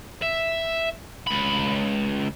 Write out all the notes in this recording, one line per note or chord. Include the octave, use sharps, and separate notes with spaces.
E5
C#2 B5